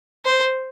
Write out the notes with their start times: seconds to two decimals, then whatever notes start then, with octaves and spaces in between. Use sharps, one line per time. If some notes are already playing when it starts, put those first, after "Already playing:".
0.25 C5